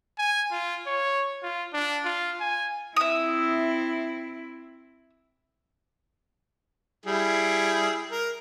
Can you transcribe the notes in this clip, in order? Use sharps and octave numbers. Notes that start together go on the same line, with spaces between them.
G#5
F4
C#5
F4
D4
F4
G#5
C4 E4 E5 D#6
G3 E4 G#4
A#4